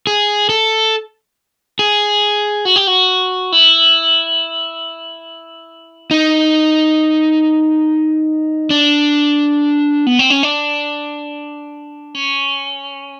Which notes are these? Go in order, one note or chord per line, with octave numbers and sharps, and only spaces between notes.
G#4
A4
G#4
F#4
G4
F#4
E4
D#4
D4
B3
C4
C#4
D4
C#4